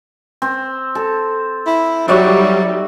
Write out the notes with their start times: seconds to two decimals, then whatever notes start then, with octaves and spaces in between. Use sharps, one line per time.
0.42 C4
0.95 A4
1.66 E4
2.08 F#3 G3 D#4 F#4 D5 E5